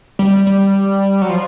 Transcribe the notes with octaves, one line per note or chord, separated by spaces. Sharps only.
G3
G3
F#3
F3